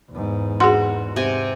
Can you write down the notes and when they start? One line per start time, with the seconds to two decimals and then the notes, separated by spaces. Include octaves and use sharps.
0.11 E2 G#2
0.60 F#4 G#4 C6
1.16 C3 G#5